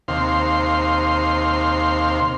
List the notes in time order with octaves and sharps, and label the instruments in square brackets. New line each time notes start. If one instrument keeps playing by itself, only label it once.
[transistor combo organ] D#2 C3 F5 C6